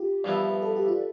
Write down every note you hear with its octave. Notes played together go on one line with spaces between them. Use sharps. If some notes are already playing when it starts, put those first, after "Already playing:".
Already playing: F4 G4
G2 F3 B3 E4 D5
E5
B4
A4
G4
F4